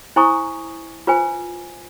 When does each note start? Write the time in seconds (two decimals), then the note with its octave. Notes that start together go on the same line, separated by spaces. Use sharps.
0.16 E4 C5 G#5 A#5 C#6 D#6
1.07 F4 B4 C5 G#5